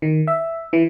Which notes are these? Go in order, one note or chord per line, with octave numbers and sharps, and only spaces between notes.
D#3
E5
E3